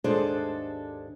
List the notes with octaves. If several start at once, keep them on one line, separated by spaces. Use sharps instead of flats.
D#2 G#2 D4 G#4 A4 C5